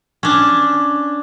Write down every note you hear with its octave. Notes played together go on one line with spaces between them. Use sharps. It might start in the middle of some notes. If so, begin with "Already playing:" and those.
C#4 D4